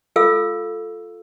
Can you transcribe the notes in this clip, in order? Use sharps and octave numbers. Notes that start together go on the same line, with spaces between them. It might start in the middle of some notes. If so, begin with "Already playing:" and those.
F4 A4 F5 E6